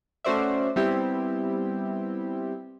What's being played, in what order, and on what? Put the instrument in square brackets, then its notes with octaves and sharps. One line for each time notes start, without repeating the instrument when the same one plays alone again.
[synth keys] A3 C#4 F#4 C5 D5 E5
G3 B3 C4 E4 G4